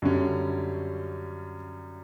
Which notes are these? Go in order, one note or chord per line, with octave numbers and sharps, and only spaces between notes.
F#2 D3 G3 C#4